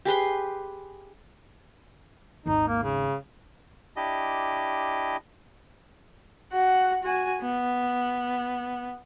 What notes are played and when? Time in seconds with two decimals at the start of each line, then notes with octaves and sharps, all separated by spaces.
0.05 G4 G#4 B4 C6
2.46 G#1 D#2 D#4
2.68 A#3
2.83 C#3
3.96 D4 E4 G4 D#5
6.52 F#4 F#5
7.03 F#4 G#5
7.42 B3